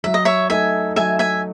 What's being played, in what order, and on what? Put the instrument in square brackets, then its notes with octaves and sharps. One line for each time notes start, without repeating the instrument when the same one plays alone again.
[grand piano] F#3 [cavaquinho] E5
[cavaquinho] D#5
C#5 E5
[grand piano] A3 D#4 [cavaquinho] E5 G#5
[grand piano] F#3 [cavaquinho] E5 G#5
[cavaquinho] E5 G#5